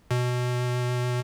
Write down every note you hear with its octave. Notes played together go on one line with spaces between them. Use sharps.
B2